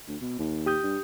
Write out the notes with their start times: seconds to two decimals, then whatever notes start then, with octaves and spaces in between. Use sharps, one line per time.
0.08 D2
0.21 B2
0.39 D#2
0.66 G4 D#6 G6
0.83 G2